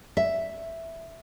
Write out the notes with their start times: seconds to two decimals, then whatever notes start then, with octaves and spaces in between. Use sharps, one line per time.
0.17 E5